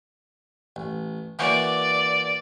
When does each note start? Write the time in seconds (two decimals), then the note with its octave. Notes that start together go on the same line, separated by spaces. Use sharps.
0.76 A1
1.39 E3 A#3 F#4 D5